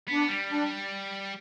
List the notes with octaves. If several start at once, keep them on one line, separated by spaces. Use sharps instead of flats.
B3 D4
G3
D4